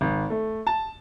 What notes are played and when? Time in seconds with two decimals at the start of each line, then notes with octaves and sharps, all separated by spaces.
0.01 G#1
0.30 A3
0.67 A5